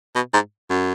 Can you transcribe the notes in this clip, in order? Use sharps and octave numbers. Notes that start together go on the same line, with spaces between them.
B2
G#2
F#2